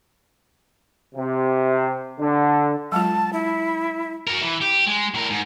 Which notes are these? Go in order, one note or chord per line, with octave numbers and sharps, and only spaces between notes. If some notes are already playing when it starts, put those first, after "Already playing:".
C3
D3
F#3 G#3 F4 A5
E4
F#4 A#4
E3
G4
G#3
A2 A#4
G#2